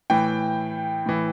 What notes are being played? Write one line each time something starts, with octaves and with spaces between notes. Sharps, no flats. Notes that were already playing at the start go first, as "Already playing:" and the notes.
A2 E3 G5
A2 E3